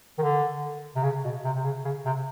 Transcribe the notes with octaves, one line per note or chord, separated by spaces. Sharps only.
D#3
D3
C3
C#3
B2
C3
C3
C#3
C#3
C3